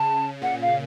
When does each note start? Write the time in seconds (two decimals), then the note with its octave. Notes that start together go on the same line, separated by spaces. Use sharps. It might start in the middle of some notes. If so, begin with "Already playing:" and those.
Already playing: C#3 A5
0.42 A#2 F#5
0.61 F5